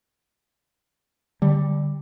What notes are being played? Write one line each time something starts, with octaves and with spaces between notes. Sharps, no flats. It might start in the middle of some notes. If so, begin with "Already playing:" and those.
D3 G3